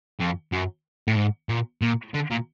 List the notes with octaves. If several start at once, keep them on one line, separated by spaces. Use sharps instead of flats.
F2
F#2
A2
G#2
A#2
A#2
D3
A#2